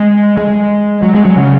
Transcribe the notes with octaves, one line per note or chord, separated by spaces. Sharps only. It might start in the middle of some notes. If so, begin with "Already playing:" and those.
Already playing: G#3
G#3
F#3
G#3
F#3
C#3